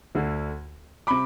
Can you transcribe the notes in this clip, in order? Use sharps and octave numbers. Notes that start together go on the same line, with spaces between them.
D2 D3
C3 B5 D6